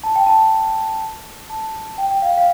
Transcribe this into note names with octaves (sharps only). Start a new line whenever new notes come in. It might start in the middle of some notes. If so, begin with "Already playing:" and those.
A5
G5
A5
A5
G5
G5
F5
F5